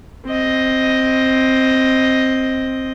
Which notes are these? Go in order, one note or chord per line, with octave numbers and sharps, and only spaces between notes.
C4 D#5